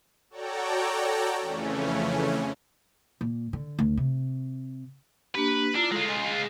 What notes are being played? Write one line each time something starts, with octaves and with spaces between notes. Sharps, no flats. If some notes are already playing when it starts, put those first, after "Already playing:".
F#4 A4 C#5 D5 G5 A#5
F2 C#3 E3 A3 C#4
A#2
D3
D2
C3
A#3 D4 G4 B4
D4 E4 F4 A#5
G#3 F4 A4
D#5 G#5
G#4